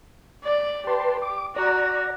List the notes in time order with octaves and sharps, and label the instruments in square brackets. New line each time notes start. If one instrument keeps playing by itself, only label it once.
[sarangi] D5
[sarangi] G4 [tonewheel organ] B4 A5 C6
[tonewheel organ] D6
[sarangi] F#4 [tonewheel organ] D5 A#5